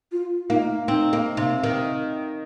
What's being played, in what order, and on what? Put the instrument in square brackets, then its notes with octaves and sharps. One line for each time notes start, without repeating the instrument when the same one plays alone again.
[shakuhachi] F4
[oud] A#3 [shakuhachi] D#4
[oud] C4 [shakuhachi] D#4
[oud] A#3
C3
D#3